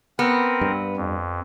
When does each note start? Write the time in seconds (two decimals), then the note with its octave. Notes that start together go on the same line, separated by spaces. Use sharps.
0.19 B3 C4 A#4
0.61 G2
0.97 F2